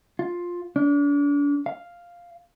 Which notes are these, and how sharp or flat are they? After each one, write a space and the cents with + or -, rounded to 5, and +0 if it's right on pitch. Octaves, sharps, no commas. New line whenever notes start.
F4 +10
D4 -35
F5 +0